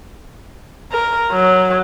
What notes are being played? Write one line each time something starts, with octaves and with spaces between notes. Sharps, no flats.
A#4
F#3